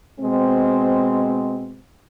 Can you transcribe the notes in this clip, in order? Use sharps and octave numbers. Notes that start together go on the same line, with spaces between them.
B2 G#3 C4